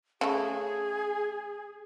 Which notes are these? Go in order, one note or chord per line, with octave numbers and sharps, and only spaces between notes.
C#3 A3 G#4